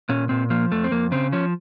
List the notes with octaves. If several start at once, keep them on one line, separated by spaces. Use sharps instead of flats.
A#2 C#4
A#2 C4
F3 A#3
F2 A3
C4
F2 A#3
C#3 C4
F3 C#4